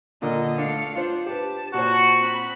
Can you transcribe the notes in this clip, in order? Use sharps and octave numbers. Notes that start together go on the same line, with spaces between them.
A#2 D3 A#4 D#5
A3 D4 F5 C#7
D4 F4 C5
G4 B4 A5
A#2 F#4 C5
C4 B5